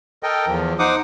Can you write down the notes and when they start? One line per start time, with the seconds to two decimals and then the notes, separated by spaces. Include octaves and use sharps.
0.23 A4 A#4 D#5 G5
0.47 E2 F3
0.79 D#4 C5 F#5 D6 D#6